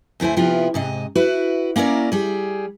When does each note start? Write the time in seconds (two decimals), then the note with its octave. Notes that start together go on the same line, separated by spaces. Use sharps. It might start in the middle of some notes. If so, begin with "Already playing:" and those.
0.20 D2 A3 E4 C5 G#5
0.36 C3 F3 B3 E4 F4
0.74 G#2 C3 D#5
1.15 E4 F#4 B4
1.76 A#3 C#4 E4 A#4 D5
2.12 G3 G#4